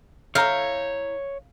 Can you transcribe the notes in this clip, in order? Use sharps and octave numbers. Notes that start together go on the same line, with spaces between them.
E4 C#5 F5 A#5 G6